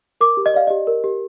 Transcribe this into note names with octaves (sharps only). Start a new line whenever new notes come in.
A#4 D6
G4
D#5
D5 F5
G4 D#5
A#4
G4